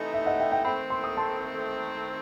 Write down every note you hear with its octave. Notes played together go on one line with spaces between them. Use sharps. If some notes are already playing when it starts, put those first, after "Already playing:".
Already playing: C3 E3 A3 D#4
E5
D#5 F#5
E5 G5
E5 G5
D#3 A3 C4 G5 B5
C6
D#6
A5 C6